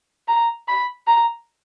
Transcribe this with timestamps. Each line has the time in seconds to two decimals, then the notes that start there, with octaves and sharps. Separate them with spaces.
0.28 A#5
0.67 B5
1.07 A#5